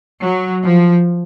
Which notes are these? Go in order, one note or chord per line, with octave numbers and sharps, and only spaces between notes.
F#3
F3